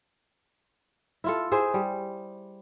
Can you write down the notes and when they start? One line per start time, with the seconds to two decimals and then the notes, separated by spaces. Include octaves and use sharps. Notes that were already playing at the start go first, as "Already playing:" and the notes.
1.24 E4 F4 A4
1.51 E4 G#4 C5
1.74 G3